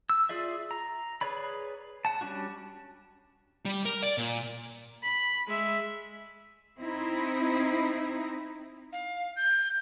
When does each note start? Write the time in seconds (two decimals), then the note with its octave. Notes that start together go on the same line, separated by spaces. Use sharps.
0.10 E6
0.29 F4 G#4 D5 E5
0.71 A#5
1.21 G#4 B4 C#5 D5 B5
2.05 F#5 A5
2.21 G3 C#4 D4 F#4
3.65 G3
3.85 A#4
4.03 D5
4.18 A#2
5.03 B5
5.47 G#3 E5
6.80 C4 D#4 E4
8.92 F5
9.36 G6